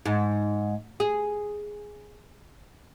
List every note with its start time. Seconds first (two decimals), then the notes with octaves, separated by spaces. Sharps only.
0.06 G#2
1.00 G#4